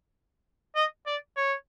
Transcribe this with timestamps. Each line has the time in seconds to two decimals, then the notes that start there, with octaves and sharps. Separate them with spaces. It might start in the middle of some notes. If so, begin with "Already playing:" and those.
0.76 D#5
1.07 D5
1.37 C#5